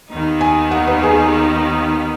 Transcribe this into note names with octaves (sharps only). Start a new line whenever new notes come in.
D#2 D#3 B3 D#4
G#5
F#5
B4
G#4
G#4